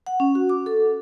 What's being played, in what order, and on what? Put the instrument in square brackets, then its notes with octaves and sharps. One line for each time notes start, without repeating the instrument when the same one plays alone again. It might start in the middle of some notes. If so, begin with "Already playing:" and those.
[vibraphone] F#5
C#4
F#4
D6
A4